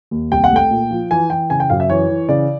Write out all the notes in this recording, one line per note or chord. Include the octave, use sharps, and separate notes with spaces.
D#2
C2 G5
F#5
A3
G5
A#2
F3
E3 G#5
E3 G5
C#3 G#5
G5
F#2 F5
E5
E3 C#5
E3
C#3 D5